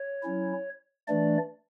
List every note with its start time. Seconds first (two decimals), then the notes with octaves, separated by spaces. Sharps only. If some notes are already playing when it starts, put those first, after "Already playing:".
Already playing: C#5
0.23 F#3 C#4 E4
1.08 E3 A3 D4 D5